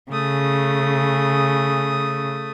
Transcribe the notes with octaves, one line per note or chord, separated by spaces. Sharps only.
C#3 A3 D#6